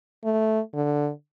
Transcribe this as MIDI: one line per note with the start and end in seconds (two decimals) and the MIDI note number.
0.25 0.60 57
0.74 1.10 50